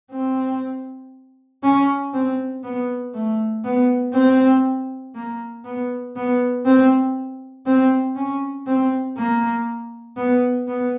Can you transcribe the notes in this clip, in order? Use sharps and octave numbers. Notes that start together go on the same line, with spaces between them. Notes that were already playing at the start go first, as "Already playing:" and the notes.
C4
C#4
C4
B3
A3
B3
C4
A#3
B3
B3
C4
C4
C#4
C4
A#3
B3
B3